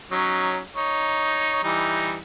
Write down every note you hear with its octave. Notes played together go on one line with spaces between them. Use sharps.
F#3 C#4 D#4
D#4 C#5
E3 G3 D#4